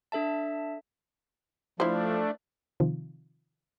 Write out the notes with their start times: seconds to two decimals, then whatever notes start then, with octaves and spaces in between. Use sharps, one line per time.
0.12 D4 A4 E5 A5
1.80 F3 A3 D4 E4 C5
2.80 C3 D#3 F3